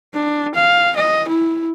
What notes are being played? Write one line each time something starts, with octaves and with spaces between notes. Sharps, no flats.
D4
F5
D#5
E4